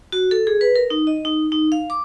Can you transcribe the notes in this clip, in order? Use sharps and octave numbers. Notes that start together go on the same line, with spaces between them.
F#4
A4
G#4
B4
A#4
D#4
D#5
D#4
D#4
F5
D6